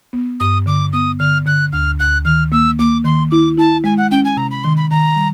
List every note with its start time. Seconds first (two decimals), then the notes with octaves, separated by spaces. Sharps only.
0.13 B3
0.40 G2 D#6
0.66 D3 D6
0.93 B3 D#6
1.19 D3 F6
1.46 D3 F#6
1.72 D2 F6
1.99 D2 F#6
2.25 D#3 F6
2.52 A#3 E6
2.79 A#3 D6
3.04 D#3 C6
3.31 E4 D6
3.58 E4 A5
3.84 G#3 G#5
3.98 F#5
4.11 C#4 G5
4.25 G#5
4.37 C3 A#5
4.51 B5
4.64 D#3 C6
4.77 B5
4.91 D#3 A#5
5.16 G3